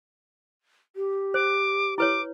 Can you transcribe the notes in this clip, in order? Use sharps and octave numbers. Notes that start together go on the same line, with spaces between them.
G4
C5 D6
E4 B4 C#5 D6